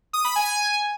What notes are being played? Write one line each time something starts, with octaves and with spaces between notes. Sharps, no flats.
D#6
B5
G#5